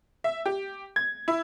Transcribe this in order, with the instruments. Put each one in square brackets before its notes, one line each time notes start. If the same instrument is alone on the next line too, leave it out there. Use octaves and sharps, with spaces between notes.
[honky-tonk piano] E5
G4
G#6
E4